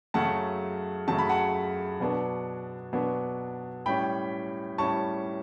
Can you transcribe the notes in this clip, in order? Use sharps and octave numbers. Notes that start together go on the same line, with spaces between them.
F#2 C#3 F#3 A3 F#5 A5
F#2 C#3 F#3 A3 A5
B5
F#5 A5
B2 F#3 B3 D4
B2 F#3 B3 D4
A2 G3 C#4 G5 B5
A2 G3 C#4 A5 C#6